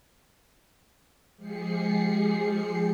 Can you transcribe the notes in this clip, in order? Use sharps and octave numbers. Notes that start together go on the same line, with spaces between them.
F3 G#3 G4 G#4 C7 C#7